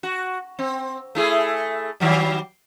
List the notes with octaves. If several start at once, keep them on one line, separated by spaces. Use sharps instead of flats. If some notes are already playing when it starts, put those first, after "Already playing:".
F#4
C4
A3 E4 G#4
D#3 F#3 G3